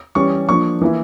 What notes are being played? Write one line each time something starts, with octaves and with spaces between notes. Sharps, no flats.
E3 G3 C#4 C#6
F3 A#3 D4 C#6
E3 A#3 E4